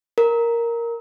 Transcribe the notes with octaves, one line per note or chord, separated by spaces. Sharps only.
A#4